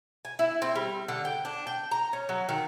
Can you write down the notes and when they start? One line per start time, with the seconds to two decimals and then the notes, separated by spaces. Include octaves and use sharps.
0.25 G#5
0.39 E4
0.62 C4
0.76 G3
1.08 D3
1.25 G5
1.45 D4
1.67 G5
1.91 A#5
2.13 C#4
2.29 F#3
2.49 D#3